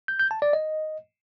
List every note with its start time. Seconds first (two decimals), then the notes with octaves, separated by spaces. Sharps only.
0.08 G6
0.20 G6
0.31 A5
0.42 D5
0.53 D#5